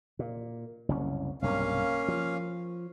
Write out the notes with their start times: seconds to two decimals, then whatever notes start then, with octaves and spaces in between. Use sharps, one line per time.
0.19 A#2
0.89 F#1 C2 C#4
1.42 B1 G2 C3 A#3 C#4 F5
2.08 F3